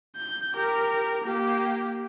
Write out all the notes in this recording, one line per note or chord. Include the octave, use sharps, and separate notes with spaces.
G6
G4 A#4
A#3 G4